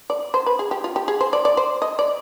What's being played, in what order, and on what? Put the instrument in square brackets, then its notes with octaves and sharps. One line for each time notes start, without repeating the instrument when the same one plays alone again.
[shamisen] D5
C5
B4
G#4
G4
F4
G4
G#4
C5
D5
D5
C5
D#5
D5